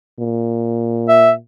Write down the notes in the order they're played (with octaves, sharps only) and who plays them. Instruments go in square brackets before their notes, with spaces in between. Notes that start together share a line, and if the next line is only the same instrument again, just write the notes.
[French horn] A#2
[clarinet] E5